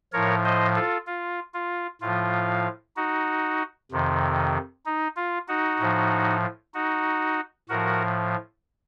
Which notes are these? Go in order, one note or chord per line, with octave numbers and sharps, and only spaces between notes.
A2 F3 A#4 C#5
C5 D#5
F4 A4
F4
F4
A2 F3 F4
D#4 F#4
F2 C3 D#3
D#4
F4
D#4 F#4
A2 F3
D#4 F#4
A2 F3 F#4 A#4